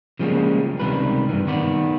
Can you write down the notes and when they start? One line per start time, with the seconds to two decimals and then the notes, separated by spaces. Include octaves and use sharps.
0.19 C#3 F3 G3 G#3 A#3 C#4
0.79 C#2 C3 D#3 G3 A#4 B4
1.29 G2 C3 E3
1.47 D#3 B3 D5